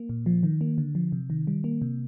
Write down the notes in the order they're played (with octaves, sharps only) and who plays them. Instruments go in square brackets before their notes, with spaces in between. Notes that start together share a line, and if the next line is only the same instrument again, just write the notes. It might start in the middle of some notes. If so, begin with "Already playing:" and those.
Already playing: [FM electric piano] A#3
A#2
F3
D#3
A#3
D3
F3
C3
D#3
G3
A#3
C3